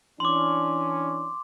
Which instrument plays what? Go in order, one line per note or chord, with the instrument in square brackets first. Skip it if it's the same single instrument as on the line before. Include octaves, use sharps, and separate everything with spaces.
[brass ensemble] E3 C#4 D4 [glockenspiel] C6 D6